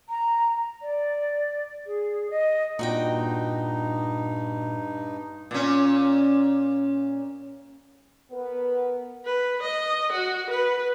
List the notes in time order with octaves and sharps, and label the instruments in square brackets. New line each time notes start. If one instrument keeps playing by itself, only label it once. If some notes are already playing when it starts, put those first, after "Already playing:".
[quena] A#5
D5
G#4
D#5
[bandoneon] G2 D#4 [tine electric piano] A#2 [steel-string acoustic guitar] F#4 D#5 G5
[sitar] A#2 C#4
[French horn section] B3 A#4 B4
[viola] B4
D#5
F#4
B4